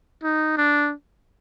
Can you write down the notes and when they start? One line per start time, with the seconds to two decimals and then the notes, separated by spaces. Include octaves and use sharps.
0.23 D#4
0.57 D4